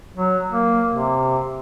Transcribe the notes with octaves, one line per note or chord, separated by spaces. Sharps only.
F#3
A#3
C3